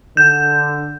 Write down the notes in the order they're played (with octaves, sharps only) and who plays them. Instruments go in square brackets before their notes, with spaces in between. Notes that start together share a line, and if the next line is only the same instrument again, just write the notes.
[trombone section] D3 [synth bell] G6